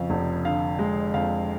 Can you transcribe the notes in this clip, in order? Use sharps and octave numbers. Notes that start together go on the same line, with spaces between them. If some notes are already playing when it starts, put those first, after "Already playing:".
Already playing: F2 C#3 F3 F5
F1
D3 F5
G#3
F2 F5